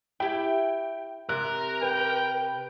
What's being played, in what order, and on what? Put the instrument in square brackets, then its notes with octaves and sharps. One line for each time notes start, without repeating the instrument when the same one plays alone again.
[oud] E4 G4 [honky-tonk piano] G5
[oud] C3 [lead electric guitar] A#4 [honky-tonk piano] F#6
[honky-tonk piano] B4 [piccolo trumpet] G5